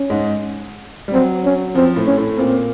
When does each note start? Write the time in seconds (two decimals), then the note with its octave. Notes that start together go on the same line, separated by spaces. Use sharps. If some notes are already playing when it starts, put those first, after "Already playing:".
Already playing: C#4
0.10 G#2 G#3
1.08 G3
1.13 F#3 C4
1.45 C#4
1.75 F3 C4
1.96 A2 A3
2.06 C#4
2.17 A2 A3
2.37 A#2 A#3 C4